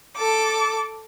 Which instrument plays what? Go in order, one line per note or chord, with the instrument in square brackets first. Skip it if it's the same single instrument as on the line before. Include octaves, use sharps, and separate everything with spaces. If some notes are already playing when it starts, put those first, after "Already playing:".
[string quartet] A4 D6